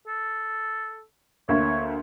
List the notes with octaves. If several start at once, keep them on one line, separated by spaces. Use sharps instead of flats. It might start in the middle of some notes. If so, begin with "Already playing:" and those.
A4
D2 A#3 C#5 E5